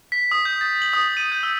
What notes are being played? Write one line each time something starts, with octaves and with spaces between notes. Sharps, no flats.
B6
D#6
G6
A6
F#7
D#6
D#7
G6
E6